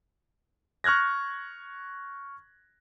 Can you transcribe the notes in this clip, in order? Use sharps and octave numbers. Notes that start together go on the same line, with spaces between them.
C#6 F6 F#6 G#6 A#6